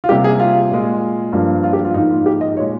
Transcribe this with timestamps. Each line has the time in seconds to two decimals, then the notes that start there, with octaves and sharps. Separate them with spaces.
0.04 F4
0.09 C3 G3 A#3 G4
0.24 G#4
0.40 F4
0.71 A#2 G#3
1.33 G2 F3 A#3
1.64 F4
1.73 G4
1.85 F4
1.94 G#2 F3 A#3 D#4
2.10 F4
2.26 G4
2.41 D#5
2.57 A#2 C#5
2.60 G#3